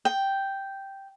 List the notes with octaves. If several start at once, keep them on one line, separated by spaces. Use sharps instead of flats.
G5